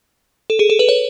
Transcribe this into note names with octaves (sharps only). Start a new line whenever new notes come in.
A4
G#4
A4
B4
C#5